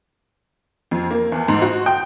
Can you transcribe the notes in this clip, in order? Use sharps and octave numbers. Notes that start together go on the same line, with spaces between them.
F2
A#3
E2
G#2
F#4
G5